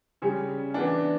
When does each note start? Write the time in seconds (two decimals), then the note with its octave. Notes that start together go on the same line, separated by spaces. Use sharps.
0.22 C#3 G3 C#4
0.74 E3 B3 D4